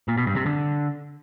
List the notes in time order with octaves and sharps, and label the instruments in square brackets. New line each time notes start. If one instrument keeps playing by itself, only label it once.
[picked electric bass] A#2
B2
G2
C3
D3